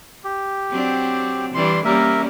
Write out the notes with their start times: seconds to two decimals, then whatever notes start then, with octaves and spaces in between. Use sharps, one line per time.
0.24 G4
0.70 F#3 C4 D4
1.54 E3 G3 D4 C6
1.85 G3 A#3 C#4 A#4 E5